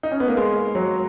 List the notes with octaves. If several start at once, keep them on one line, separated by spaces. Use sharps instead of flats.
D#4
C#4
B3
A#3
G#3
F#3